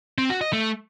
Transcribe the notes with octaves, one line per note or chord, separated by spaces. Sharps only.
C4
F#4
D#5
A3